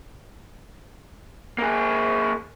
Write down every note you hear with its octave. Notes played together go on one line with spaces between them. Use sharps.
A#3 G#4